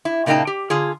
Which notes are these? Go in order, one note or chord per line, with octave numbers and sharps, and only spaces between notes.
E4
A#2 C#3 A#3 D#4 G5 A5
G4
D3 F4 G#4